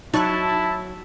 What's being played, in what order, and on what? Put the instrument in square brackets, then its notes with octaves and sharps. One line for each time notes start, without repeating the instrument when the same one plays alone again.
[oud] F#3 [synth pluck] D#4 C#6 F#6 [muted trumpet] E4 [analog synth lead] A5